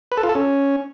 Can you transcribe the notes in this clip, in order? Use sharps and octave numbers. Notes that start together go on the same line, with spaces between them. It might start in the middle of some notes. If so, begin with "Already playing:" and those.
B4
A4
F4
A4
C#4